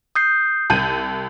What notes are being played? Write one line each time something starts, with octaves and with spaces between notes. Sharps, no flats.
D#6 G6 C7
C2 A5 G6 D#7